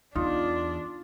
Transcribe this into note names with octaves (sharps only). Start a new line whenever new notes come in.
E2 D4 D#4 F4